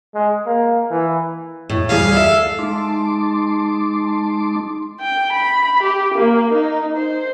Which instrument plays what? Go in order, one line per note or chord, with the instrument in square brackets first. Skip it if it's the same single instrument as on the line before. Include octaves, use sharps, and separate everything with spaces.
[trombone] G#3
A#3
E3
[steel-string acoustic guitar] A2
[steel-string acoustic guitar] D2 G3 G#4 [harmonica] F5
[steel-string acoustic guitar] A4 E5
[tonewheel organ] G#3 D#4 A5 C6 D6
[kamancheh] G5
B5
G4
A#3
D#4
C5